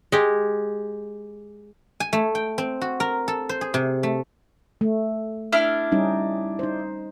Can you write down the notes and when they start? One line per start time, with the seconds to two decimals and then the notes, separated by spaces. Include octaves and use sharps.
0.12 G#3 G4
2.00 G#5
2.13 A3
2.35 G5
2.58 C4
2.81 F#4
3.00 A#4
3.28 A4
3.49 C5
3.61 G#4
3.74 C3
4.03 A3
4.81 A3
5.53 D4 E4 F6
5.92 G3 C#4 D#4
6.59 D#4 C5